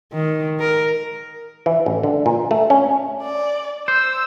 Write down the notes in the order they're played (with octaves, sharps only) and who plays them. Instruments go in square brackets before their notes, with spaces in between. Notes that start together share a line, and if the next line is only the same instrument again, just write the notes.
[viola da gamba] D#3
A#4
[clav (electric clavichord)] E3
A1
D3
A#2
A3
C#4
[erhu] D5
[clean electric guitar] C5 [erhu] E6